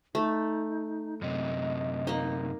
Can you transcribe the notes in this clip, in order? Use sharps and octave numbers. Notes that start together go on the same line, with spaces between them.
A3 D#4
F#2 C3 D#5
A#3 D#4